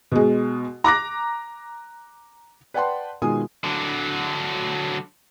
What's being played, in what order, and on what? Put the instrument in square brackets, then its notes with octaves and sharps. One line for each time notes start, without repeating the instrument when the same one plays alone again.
[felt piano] B2 G#3
A#5 D6 F#6 A#6
B4 D5 F#5 G5 A5 C6
B2 D#3 G#3 F4 G#5 D#6
[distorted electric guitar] D3 F#3